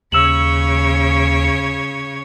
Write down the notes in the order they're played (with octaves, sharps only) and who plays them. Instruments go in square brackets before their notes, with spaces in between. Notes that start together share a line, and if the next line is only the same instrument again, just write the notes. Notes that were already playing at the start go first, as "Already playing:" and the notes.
[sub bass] D#2 [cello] C#3 C#5 [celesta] E6 E7 F#7